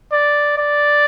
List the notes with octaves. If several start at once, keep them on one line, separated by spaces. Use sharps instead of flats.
D5
D5